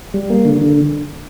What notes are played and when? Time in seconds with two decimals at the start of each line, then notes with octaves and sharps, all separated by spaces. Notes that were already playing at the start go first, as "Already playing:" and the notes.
0.14 G3
0.30 A#3
0.45 D3
0.61 D3